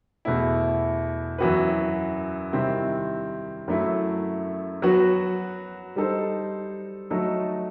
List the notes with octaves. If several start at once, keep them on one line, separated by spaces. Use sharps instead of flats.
E2 B2 A3 E4
F#2 E3 B3 F#4 B4
C3 D#3 G3 C4 E4
F#2 F#3 A3 E4
F#3 B3 F#4
G3 D#4 A4 C5
F#3 A3 D#4 A4